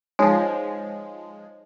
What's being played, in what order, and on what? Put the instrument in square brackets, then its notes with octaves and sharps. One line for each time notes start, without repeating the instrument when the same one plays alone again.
[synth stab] F3 G#3 [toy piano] D#4 C#5 G#5